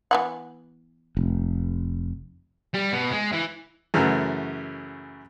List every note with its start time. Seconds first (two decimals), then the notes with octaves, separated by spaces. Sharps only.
0.11 E3 B3 F#5
1.17 F1
2.74 G3
2.93 B2
3.12 G#3
3.33 E3
3.94 F#2 C#3 E3 A3 F#4